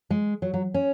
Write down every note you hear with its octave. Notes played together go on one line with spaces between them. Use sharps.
G#3
F#3
F#3
C#4